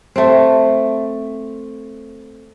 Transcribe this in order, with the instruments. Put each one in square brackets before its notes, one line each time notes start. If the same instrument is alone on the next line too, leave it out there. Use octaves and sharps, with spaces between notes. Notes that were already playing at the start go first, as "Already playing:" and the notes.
[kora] A3 C4